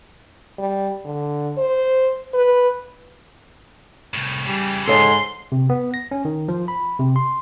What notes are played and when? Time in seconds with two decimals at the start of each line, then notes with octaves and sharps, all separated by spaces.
0.59 G3
1.05 D3
1.58 C5
2.34 B4
4.14 C2 A2
4.46 C#3 E3 G3
4.87 G#2 A4 C#5 D#5 C6
5.52 C3
5.70 B3
5.94 A#6
6.11 C#4
6.25 D#3
6.48 F3
6.68 B5
6.99 C3
7.16 C6